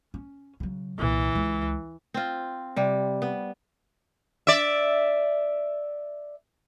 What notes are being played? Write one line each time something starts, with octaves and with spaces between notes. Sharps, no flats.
C#4
C#3 F#3
C2 A#2 E3
C#2
C4 F4
C3 G3
B3
D5 E5